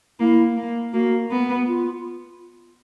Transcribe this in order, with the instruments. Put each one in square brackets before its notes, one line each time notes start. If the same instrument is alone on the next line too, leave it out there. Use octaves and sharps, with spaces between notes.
[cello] A#3 [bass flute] E4
[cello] A#3
[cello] A#3 [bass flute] F#4
[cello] B3
[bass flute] F4